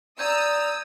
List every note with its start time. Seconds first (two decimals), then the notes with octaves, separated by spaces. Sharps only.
0.19 D5 A#5 D#6 E6 G6 G#6